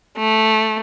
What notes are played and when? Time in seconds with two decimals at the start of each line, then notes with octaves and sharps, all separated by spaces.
0.18 A3